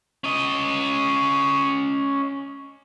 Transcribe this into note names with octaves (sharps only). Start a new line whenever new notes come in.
C#4 D#5